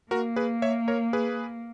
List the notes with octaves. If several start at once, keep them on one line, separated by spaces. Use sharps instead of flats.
A#3 F#4 A#4
G#4 B4
C#5 E5
A#4 C#5
G#4 B4